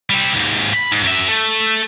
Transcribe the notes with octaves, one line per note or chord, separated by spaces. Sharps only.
G3 C4
D#2 G#2
B5
G#2
F#2 E5
A3